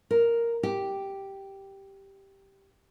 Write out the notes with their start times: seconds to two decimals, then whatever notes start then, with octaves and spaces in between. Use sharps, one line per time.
0.11 A#4
0.63 G4